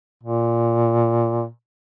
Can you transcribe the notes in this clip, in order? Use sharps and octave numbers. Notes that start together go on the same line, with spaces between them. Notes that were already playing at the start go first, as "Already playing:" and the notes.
A#2